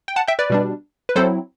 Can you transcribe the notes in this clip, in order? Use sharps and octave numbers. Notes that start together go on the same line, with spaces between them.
G5
F#5 A5
E5 G5
B4 D5
B2 G3 D4
B4
F#3 C4 E4 A4 C5